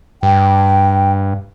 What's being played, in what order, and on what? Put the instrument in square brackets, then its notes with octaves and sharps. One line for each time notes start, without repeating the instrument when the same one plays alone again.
[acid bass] G2 [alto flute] G5